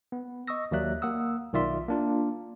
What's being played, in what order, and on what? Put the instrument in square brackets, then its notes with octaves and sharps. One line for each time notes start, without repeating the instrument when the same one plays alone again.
[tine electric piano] B3
D#5 C#6 D#6 E6 A#6
D#2 F#3 A#3 D5 E5 F#6
A#3 F#5 D#6 E6
B1 D#3 F4 D5 E5 C6
A#3 D4 F4